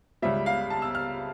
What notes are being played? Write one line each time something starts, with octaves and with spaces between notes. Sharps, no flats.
C#2 C#3 G3 E5
F5
A5
E6
F6